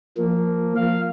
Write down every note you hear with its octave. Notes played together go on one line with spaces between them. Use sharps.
F3 A#3
F5